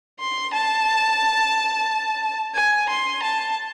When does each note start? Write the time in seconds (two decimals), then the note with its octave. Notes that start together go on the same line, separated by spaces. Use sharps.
0.20 C6
0.53 A5
2.55 G#5
2.89 C6
3.23 A5